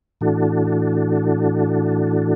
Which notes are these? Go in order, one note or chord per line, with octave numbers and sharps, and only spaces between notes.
A2 E3 D4 F#4 A4